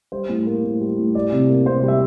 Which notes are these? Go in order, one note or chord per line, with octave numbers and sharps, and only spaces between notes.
G3 C5
A2
A#3
A2
G3
A2
G3 D5
C3
A#3
C3 C5
G3
E5